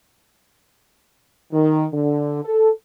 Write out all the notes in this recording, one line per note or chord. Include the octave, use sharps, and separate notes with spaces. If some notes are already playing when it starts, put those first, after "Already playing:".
D#3
D3
A4